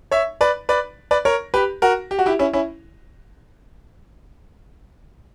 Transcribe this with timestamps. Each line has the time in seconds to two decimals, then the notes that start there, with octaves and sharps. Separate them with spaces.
0.11 C#5 E5
0.41 B4 D5
0.69 B4 D5
1.11 B4 D5
1.25 A#4 C#5
1.54 G4 B4
1.82 F#4 A#4
2.11 G4
2.19 F#4
2.26 E4 G4
2.39 C#4 E4
2.53 C#4 E4